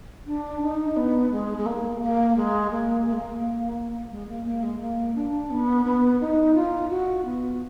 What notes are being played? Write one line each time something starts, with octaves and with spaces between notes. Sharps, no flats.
D4
D#4
B3
G#3
G#3
A#3
A#3
G#3
A#3
A#3
G#3
A#3
G#3
A#3
A#3
G#3
A#3
D4
B3
B3
D#4
F4
F#4
B3